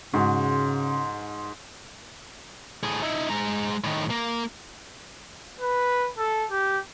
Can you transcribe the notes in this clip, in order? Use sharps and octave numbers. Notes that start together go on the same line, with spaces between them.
G#2 C#3 F#4 C6
A2 G#4
D#4 E4
G#3 A#5
A2 D#3
A#3
B4
A4
G4